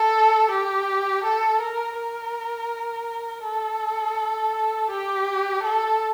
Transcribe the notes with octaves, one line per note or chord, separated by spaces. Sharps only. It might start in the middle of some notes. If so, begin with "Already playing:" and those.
Already playing: A4
G4
A4
A#4
A#4
A4
G4
A4